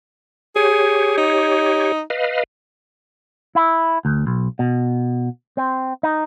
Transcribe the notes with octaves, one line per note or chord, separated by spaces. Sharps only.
G4 G#4 C#5
D#4
B4 D#5 F5
E4
D2
B1
B2
C4
D#4